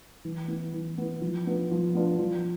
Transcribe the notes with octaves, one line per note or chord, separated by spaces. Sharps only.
E3
B3 E4
E3
B3 E4
F3
B3 D4 F4
F3
B3 D4 F4
F3